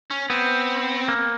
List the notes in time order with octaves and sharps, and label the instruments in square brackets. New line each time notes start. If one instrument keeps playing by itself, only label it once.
[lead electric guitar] C#4
[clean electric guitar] B3 [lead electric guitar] C4
[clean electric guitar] A#3